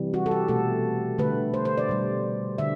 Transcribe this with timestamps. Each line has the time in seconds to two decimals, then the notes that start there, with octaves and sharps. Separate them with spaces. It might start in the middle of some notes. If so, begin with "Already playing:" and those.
Already playing: C3 E3 G3
0.14 F#4
0.26 A4
0.31 G4
0.48 B2 A3 A4
1.18 D3 A3 B4
1.54 C5
1.65 C5
1.78 D5
1.89 B2 G3
2.58 D3 E5